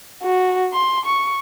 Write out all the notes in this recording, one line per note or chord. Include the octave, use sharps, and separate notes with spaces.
F#4
C6
C#6